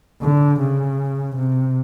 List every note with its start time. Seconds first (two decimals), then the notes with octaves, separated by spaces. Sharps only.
0.21 D3
0.60 C#3
1.36 C3